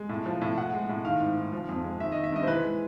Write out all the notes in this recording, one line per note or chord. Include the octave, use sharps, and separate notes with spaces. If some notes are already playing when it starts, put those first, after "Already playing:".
Already playing: G#3
A2
F3
A2
A2 F#5
G#3
A2
D#3 F5
G#2
G#2
F3
F2
G#3
D#3 E5
D#3 D#5
E5
G2 D#5
C5
E3 B4
G#3